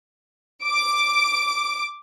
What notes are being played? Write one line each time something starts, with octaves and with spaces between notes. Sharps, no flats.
D6 D7